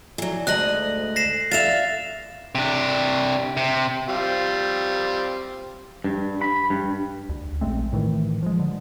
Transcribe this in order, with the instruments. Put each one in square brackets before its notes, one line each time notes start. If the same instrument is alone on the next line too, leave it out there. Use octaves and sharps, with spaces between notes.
[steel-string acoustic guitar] E3 F#3
[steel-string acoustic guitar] D2 G#2 D#5 [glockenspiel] F#6 A#6 F#7
[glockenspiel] A#6 C7 E7
[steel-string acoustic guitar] E5 F5 [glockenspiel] A6 E7 F7
[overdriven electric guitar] C3 D4
C3
[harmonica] G3 C4 F4
[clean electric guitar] G2
B5
G2
[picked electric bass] D2
A#1 G#3 A3 C4
A2 D#3 E3 A3
F3 G#3
D3